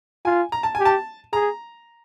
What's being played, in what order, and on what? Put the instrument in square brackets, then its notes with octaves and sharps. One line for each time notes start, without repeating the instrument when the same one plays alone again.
[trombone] F4 [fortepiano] G#5
[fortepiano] A#5
A5
[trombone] G4 [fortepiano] G#5
[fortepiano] A5
[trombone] G#4 [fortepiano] A#5